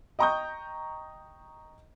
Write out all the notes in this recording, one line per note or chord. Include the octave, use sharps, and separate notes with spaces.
D#5 G5 A#5 C#6 D#6 G6